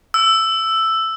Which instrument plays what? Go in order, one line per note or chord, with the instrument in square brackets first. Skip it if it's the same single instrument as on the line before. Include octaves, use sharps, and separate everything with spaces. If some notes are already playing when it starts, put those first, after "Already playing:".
[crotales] E6